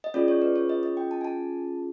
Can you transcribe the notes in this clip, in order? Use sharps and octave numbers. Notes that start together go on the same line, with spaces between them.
D#5
C#4 F4 G#4 D5
C#5
B4
C#5
D#5
D#5
G5
A5
G#5
A5